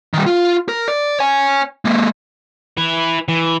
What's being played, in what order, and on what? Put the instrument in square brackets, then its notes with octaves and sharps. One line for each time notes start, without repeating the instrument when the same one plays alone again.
[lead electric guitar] D#3 G3
F4
A#4
D5
C#5 G#5
G#3 A#3
[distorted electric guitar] E4 B4
E3